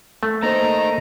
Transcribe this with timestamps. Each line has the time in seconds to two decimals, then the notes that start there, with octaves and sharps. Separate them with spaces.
0.23 A3
0.43 D#3 A#3 D#4 C5 A#5